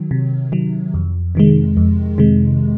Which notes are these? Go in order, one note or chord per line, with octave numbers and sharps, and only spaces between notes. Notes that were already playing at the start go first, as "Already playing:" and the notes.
Already playing: D#3 F#3
C3
D#3 F#3
F2
C3 D#3 G#3
F2
C3 D#3 G#3